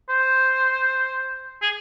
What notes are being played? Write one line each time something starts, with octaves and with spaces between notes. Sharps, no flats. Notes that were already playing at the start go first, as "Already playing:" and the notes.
C5
G#4